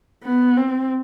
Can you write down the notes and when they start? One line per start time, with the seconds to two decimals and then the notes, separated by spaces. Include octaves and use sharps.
0.24 B3
0.57 C4